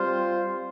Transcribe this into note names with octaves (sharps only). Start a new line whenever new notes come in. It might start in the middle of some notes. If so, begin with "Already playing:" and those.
Already playing: G3 C4 F4 C5